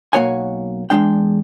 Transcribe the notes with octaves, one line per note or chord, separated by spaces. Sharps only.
B1 A#3 F#4 C#5 F#5 G#5
E2 G#2 G#3 D4 G5